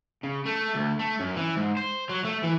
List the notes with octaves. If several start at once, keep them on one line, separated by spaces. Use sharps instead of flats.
C#3
A3
D2
A3
F#2
E3
G#2
C5
F#3
A3
E3